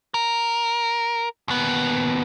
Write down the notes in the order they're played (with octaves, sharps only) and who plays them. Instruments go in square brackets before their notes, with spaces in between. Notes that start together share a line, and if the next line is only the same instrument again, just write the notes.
[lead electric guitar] A#4
D#2 B3